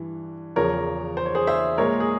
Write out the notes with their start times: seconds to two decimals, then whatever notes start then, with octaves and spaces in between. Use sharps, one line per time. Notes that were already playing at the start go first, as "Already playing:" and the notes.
Already playing: G2 E3
0.56 E2 C#3 F3 A#4 C#5
1.17 C5
1.26 C#5
1.35 G#4 C5
1.47 C5 E5
1.78 A#2 G#3 A#4 C#5
2.00 G#4